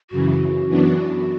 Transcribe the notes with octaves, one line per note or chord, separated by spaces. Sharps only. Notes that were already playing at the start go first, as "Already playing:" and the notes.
F#2 C#3 E3 F#4
F#2 E3 B3 D4